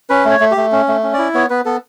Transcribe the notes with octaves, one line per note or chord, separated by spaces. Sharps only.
C#4 B4
A3
C#5
A3
G4
A3
C#4
A3
C#4
E4 D5
B3 C#5
B3 B4
B3 A4